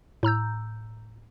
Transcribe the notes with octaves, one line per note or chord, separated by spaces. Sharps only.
A2 A#5 E6 G6